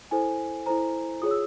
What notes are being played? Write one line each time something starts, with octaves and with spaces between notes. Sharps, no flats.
E4 A4 C5 G#5
E4 A4 C5 A#5
F4 G#4 C#5 D#6
E6